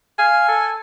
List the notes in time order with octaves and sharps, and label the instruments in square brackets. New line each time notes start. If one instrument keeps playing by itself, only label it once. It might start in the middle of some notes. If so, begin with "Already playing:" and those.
[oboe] F5 [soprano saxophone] G#5
[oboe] A4